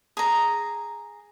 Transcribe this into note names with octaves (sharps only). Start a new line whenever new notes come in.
G#4 A#5